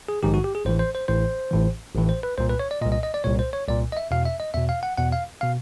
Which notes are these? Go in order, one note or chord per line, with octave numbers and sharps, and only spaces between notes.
G#4
A#1 G#2 D#3 G4
F#4
G4
G#4
A1 A2 E3 C5
C5
C5
A1 A2 E3 C5
A1 A2 E3
A1 A2 E3
C5
B4
C2 A#2 C5
B4
C#5
D5
C2 A#2 D#5
D#5
D#5
D5
C2 A#2 C#5
C5
C#5
C2 A#2 D5
D#5
E5
E2 B2 F5
E5
D#5
E2 B2 E5
F5
F#5
E2 B2 F#5
F5
B2 F5